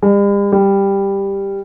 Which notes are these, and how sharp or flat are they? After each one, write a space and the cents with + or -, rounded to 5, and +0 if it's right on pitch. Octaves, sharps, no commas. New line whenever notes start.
G3 +45
G3 +10